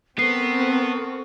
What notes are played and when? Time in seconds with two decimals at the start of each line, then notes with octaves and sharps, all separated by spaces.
0.19 B3 C4 A4 A#4 C#6 C7